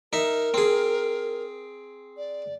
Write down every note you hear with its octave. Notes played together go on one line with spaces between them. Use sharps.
D#4 A#4 E5
C4 G#4
D5